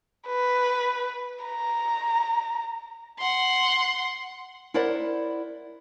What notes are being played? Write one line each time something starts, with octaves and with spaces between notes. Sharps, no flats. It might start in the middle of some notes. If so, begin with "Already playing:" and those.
B4
A#5
F#5 C6
E4 A#4 C5 D5 F#5